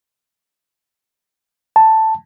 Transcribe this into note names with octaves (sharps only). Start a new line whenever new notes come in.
A5